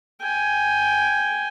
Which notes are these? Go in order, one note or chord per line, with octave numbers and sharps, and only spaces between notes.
G5 G#5